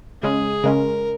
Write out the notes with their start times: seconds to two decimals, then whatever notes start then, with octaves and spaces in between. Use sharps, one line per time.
0.23 C#3 G#3 C#4 G#4
0.64 C#3 G#3 C#4 A#4